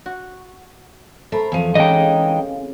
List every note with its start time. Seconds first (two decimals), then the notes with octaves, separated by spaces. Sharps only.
0.06 F#4
1.32 A3 A4 A#4 C5 B5
1.52 E2 F3 C4 F5 G#5
1.75 E2 C#3 E3 G#3 D#4 G4 D#5 G5